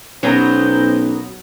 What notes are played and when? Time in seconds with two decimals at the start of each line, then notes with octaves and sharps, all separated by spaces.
0.23 B1 F#3 B3 C#4 D#4 F#4 A#4 C5